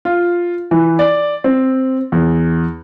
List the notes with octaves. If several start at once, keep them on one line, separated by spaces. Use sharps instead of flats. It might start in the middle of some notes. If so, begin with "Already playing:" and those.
F4
E3
D5
C4
E2